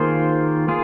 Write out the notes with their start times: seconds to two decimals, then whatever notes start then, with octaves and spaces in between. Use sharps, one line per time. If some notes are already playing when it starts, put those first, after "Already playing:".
Already playing: D#3 A#3 F4 G#4 C5
0.68 A#3 F4 G#4